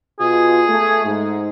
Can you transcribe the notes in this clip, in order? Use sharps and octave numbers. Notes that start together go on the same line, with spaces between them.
B2 F4 G#4
A3
G#2